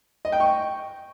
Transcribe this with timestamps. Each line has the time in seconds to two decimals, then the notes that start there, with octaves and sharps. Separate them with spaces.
0.25 D#5
0.32 G5
0.40 C#6